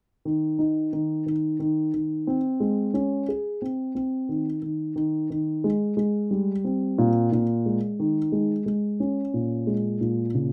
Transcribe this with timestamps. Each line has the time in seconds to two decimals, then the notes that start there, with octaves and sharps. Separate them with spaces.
0.25 D#3
0.59 D#4
0.93 D#3
1.26 D#3
1.59 D#3
1.94 D#3
2.27 C4
2.60 G#3
2.94 C#4
3.29 G#4
3.62 C4
3.95 C4
4.29 D#3
4.62 D#3
4.96 D#3
5.30 D#3
5.64 G#3
5.97 G#3
6.31 G3
6.65 C4
6.98 A#2
7.32 A#2
7.66 G#3
8.00 D#3
8.32 G#3
8.66 G#3
9.00 C#4
9.34 A#2
9.67 G#3
10.01 A#2
10.35 C#3